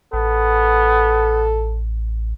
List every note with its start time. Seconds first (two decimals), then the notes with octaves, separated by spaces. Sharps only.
0.13 A1 B3 A4